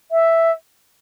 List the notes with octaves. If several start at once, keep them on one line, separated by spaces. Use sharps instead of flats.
E5